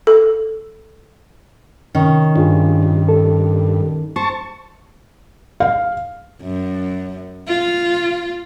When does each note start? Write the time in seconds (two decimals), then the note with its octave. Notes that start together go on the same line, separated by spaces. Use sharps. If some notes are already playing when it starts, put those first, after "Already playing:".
0.07 A4
1.95 C3 D#3 C#4
2.36 G2 D4 F4 G#4
3.09 A4
4.16 C5 A5 C#6
5.60 F5
6.42 F#2
7.48 F4